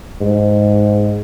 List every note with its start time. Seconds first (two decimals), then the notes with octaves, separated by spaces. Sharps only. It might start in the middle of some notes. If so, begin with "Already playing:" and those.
0.21 G#2